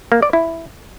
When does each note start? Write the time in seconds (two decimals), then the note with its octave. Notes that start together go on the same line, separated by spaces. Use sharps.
0.12 A#3
0.22 D5
0.33 E4